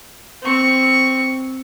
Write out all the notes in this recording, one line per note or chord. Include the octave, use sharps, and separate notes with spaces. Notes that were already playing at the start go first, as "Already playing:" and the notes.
C4 C#6